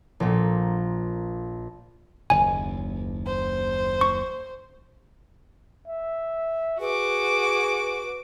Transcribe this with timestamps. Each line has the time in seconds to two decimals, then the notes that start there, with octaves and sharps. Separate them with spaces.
0.20 A#1 A#2
2.30 F#1 D#2 G#5
3.26 C5
4.01 C#6
5.88 E5
6.80 F#4 G#4 B4 D6